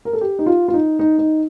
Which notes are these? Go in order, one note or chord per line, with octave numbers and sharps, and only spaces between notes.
A#4
A4
G4
D#4
F4
F4
D#4
D#4
D#4